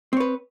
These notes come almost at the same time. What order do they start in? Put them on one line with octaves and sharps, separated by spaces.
C4 C#5 B4